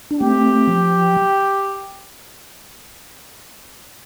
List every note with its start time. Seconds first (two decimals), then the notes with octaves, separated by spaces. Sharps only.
0.11 D4
0.20 A3 C4 G4
0.67 F3